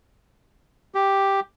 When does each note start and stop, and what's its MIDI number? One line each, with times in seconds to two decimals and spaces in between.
0.95 1.40 67